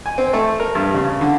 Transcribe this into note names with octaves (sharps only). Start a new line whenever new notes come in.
G#5
C4
A3
A#4
G2
C#3
D3